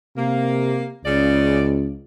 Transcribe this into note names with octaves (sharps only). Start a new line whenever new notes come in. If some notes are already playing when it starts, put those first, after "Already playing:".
C3 A#3
C#2 C#3 D5